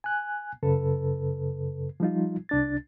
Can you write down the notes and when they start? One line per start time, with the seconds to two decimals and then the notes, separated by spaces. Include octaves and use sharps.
0.04 G#5 F#6
0.63 F#2 C#3 A4 B4
2.00 F3 G3 D#4 F4
2.49 C2 D4 A6